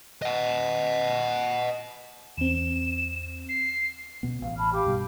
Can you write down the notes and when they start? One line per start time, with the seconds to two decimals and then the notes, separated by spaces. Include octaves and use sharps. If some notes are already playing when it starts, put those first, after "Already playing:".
0.22 D#5 F#5
2.38 E2 C4 E7
3.49 C7
4.23 B2 B3
4.42 A1 F5
4.58 A5 B5 F6
4.73 G4 F5 D6
4.86 G2 B2 G3